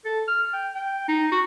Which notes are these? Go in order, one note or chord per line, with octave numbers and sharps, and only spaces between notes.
A4
F6
G5
G5
D#4
F#4